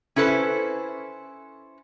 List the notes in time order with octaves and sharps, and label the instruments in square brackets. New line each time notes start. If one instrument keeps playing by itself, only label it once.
[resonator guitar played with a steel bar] C#4 E4 A4 B4 C5